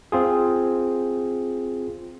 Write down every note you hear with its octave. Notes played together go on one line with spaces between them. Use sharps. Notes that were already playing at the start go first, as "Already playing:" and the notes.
C4 F4 G#4